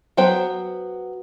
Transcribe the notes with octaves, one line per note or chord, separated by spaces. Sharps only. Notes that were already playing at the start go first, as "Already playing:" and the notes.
F#3 B3 C5 G5